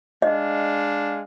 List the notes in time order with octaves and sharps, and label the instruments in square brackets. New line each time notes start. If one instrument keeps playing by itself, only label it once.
[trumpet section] G#3 D4 F5 [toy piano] D#5